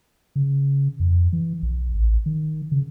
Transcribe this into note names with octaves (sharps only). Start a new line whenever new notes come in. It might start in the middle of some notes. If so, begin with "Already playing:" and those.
C#3
F2
E3
B1
A1
D#3
C#3